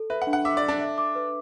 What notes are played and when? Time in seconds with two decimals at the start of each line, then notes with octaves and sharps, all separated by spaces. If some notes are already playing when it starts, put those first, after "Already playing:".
Already playing: A4
0.10 B4 E5
0.22 F#5
0.27 D4
0.33 F#5
0.45 E5 D6
0.57 D5
0.63 E5
0.68 D4
0.80 E5
0.98 D6
1.15 B4